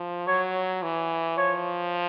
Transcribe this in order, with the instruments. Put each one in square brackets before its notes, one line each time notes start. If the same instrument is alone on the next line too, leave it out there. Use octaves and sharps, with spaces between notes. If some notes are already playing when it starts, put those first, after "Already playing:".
Already playing: [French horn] F3
[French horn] F#3 [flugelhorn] C#5
[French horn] E3
[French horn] F3 [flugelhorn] C#5